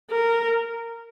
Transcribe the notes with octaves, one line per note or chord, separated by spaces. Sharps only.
A#4